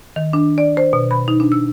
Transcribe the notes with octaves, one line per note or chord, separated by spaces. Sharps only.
D#3
D4
D5
C5
B2
B5
D#4
D4
E6